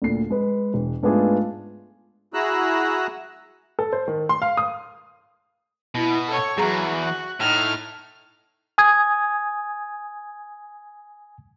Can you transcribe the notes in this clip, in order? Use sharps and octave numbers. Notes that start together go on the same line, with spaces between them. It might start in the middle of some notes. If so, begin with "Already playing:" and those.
D2 A#2 C7
G#3 B4
E1
G#2 A3 B3 D4 F4 G#4
E4 F#4 G#4 A#5 E6 F#6
A4
C5
D#3
C6
F5
D#6
B2 E4
A4 C#5 C#7
E2 G2 F#3 F#4 G#4 A#5
F#6
A2 D#4 F6
G#5 D#6 G#6